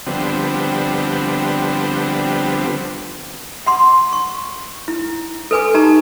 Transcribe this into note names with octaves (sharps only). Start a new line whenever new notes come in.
D3 F3 G3 B3 C4
F#5 C6 D6
C#6
E4
A4 B4 G#5 D6
D#4 G4 A5 A#5